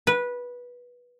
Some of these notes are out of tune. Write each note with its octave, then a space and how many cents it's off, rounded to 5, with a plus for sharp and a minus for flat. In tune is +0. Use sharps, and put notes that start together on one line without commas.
B4 -15